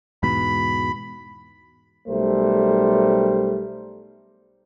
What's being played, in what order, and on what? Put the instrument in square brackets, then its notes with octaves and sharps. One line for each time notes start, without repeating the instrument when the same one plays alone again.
[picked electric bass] E2 G#2 B2 [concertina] B5
[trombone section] B1 G3 A3 A#4 C5